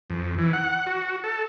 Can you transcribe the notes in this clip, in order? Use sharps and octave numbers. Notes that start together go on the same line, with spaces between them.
F2
E3
F#5
F#4
A4